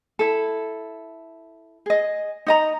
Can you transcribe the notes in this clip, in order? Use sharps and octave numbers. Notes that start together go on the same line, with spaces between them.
E4 A4
G#4 D#5
D#4 D#5 A#5